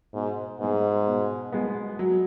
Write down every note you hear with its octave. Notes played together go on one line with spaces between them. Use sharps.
G#2 B2
G#2 G#3 B3
B2
G#3 B3
F#3